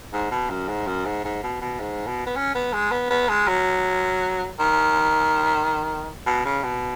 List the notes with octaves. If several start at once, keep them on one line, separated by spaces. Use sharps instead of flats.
G#2
B2
F#2
G#2
F#2
G#2
G#2
B2
B2
G#2
B2
B3
C#4
B3
G#3
B3
B3
G#3
F#3
D#3
B2
C#3
B2